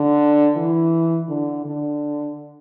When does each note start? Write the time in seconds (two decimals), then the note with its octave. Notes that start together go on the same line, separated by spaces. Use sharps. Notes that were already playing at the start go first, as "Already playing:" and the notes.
Already playing: D3
0.57 E3
1.29 D3
1.66 D3